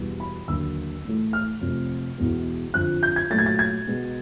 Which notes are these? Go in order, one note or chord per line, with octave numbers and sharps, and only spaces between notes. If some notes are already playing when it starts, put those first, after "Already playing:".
Already playing: E2 B2 G3 B3
B5
D#2 D3 F#3 A#3 E6
A2 E3 A3
F6
F2 C3 F3 A3
E2 B2 G#3 B3
F2 D3 F3 F#6
G6
G#6
A#2 F#3 A3 A6
G#6
A6
G#6
B2 G#3 B3